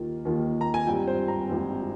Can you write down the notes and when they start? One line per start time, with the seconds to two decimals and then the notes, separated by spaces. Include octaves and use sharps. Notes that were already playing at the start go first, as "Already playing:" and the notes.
Already playing: D#2 D#3 A#3 F4
0.25 D#2 D#3 A#3 F4
0.61 A#5
0.74 G#5
0.87 G#1 G2 G3 C4 F4 G5
1.07 C5
1.28 A#5
1.49 G#1 G2 G3 C4 F4